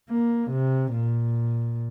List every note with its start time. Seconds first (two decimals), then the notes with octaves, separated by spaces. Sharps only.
0.10 A#3
0.51 C3
0.93 A#2